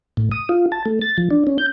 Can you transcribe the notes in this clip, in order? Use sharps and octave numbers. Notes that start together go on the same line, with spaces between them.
A2
D#6
F4
A5
A3
A6
F3
D4
C#4
G6